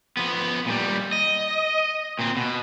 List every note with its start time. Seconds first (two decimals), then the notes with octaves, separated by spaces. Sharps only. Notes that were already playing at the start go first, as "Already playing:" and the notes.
0.17 F3 B3
0.67 A#2 G3
1.12 D#5
2.19 A#2 C4
2.37 B2